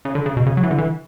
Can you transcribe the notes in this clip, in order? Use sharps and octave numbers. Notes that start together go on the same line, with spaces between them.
C#3
D3
C#3
B2
C#3
F#3
E3
D3
E3